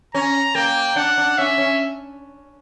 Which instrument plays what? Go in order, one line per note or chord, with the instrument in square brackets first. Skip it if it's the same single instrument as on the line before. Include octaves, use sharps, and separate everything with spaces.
[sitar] C#4 [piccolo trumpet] A#5
[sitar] A#3 [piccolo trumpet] G5
[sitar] D4 [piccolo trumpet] F#5
[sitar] D4
[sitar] C#4 [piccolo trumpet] E5
[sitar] C#4